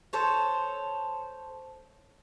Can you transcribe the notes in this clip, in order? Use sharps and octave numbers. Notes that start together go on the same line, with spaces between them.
A4 C5 C#5